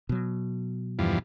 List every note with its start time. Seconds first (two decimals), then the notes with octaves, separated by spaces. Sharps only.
0.09 B2 F#3
0.99 E2 G2 F3